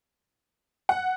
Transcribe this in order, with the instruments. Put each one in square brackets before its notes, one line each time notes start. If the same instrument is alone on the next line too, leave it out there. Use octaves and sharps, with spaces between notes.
[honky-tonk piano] F#5